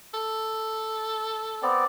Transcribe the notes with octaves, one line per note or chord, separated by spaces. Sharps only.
A4
B3 C4 D5